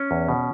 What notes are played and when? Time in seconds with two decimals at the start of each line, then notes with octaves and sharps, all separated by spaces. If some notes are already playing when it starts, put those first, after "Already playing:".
Already playing: C#4
0.11 E2
0.29 B2